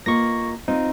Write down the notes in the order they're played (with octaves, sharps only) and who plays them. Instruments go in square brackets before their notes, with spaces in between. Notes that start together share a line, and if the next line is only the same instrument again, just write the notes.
[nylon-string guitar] A#3 F4 D#5 [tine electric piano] C#6 A#6
[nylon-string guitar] C4 F4 [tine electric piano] D#4